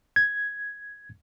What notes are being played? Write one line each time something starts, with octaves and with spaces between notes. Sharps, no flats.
G#6